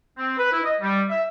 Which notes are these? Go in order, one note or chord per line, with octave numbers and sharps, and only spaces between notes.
C4
B4
E4
D#5
G3
E5